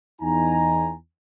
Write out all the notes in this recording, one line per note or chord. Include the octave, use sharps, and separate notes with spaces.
E2 D#4 G#5 A#5